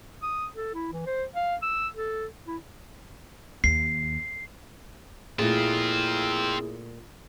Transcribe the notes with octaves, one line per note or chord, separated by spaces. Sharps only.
D#6
A4
E4
E3
C5
F5
E6
A4
E4
D#2 C7
A#2 A3 C4 E4 F4 G#4